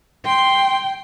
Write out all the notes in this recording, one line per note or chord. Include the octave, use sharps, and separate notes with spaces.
G5 C6